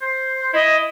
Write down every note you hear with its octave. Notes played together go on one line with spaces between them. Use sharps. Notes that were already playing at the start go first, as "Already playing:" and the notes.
C5
E4 D#5